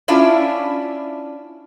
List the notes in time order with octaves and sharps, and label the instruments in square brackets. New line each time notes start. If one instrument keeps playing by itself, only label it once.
[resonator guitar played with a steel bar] C#4 D4 E4 F4